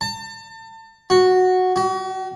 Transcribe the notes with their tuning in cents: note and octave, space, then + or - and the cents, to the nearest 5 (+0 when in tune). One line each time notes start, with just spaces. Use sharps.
A5 +35
F#4 -5
F#4 +40